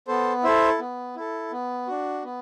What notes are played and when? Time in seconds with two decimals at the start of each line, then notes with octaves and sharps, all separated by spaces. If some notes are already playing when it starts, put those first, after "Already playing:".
0.08 B3 A4 C5
0.44 E4 A4 C5 E5
0.79 B3
1.16 E4 A4
1.52 B3
1.87 D4 F#4
2.24 B3